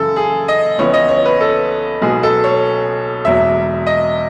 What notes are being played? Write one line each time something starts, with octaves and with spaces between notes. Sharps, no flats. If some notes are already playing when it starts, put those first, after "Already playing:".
Already playing: F#2 C#3 E3 G#3 A4
G#4
D#5
C#2 C#3 E3 B3 C#5
D#5
C#5
B4
A4
B1 B2 G#3 B3 G#4
A4
C#5
E1 E2 B2 F#3 E5
D#5